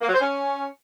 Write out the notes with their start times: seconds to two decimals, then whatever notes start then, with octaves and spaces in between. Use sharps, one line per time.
0.02 A#3
0.08 F#3
0.14 C5
0.21 C#4